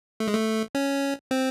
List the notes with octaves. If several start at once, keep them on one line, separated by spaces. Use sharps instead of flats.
A3
G#3
A3
C#4
C4